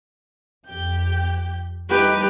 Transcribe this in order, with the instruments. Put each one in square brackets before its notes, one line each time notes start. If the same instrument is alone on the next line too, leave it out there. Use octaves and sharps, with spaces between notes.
[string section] F2 G4 G6
[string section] G3 D#4 A4 [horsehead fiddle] G4 B4